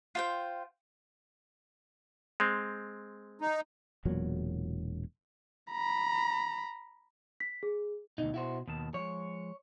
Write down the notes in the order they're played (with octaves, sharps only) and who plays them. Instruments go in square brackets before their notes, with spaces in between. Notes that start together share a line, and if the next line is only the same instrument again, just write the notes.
[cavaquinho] F4 C5 G5
[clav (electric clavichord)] G#3 C4
[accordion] D#4
[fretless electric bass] E1 E2 A#2 F#3
[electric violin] A#5 B5
[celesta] B6
G#4
[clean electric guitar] D2 D#4 [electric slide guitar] B2
[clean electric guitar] E4 F#4 C5
[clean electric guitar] D#2 [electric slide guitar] B2 D#3 A5
[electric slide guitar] F3 G#3 [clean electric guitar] C#5